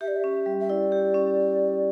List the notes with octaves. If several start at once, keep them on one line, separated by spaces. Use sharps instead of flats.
G4 E5
D5
E5
C#4
G3
E5
E4 D5
G4
C#4